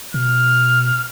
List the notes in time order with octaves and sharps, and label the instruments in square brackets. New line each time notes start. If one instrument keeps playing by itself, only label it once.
[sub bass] B2 [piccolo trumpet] F6